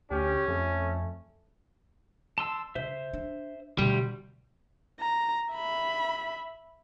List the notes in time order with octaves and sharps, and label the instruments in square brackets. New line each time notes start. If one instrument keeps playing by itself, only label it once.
[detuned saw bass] D2 [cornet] C#4 [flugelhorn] G4
[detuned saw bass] F2 [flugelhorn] A3
[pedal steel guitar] A5 C6 E6
[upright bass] C#3 [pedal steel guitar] C5 E5
[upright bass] D4
[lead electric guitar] D2 G3 [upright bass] B2
[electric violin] A#5
E5 B5